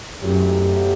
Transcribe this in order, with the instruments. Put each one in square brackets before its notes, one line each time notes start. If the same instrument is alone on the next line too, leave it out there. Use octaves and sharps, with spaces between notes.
[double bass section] F#2 [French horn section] B2 F#3 A3 E4 G4